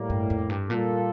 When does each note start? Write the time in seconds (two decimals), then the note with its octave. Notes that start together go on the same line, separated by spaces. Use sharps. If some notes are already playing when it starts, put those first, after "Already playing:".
Already playing: A2 G3 A#3
0.10 G2
0.30 F2
0.49 G2
0.69 A#2 G3 A#3 F4 A4